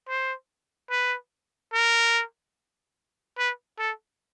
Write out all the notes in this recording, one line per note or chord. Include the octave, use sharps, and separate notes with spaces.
C5
B4
A#4
B4
A4